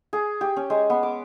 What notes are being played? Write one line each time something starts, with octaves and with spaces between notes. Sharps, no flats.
G#4
G4
C#4
G#3
B3
D6